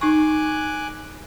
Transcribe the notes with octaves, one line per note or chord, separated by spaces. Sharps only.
D#4 G#5 C#6 D6 F#6